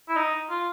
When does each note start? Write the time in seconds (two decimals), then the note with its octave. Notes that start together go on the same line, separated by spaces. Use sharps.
0.09 E4
0.16 D#4
0.50 F4